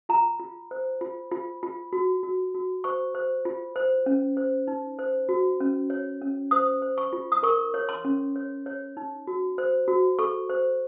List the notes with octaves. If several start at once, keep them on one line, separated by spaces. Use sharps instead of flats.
F4 A#5
F4
C5
F4
F4
F4
F#4
F#4
F#4
C5 C#6
C5
F4
C5
C#4
C5
D#4
C5
F#4
C#4
C#5
C#4
C5 D#6
C5
C#6
F4
D#6
A#4 C#6
C#5
C6
C#4
C#5
C#5
D#4
F#4
C5
F#4
A4 C#6
C5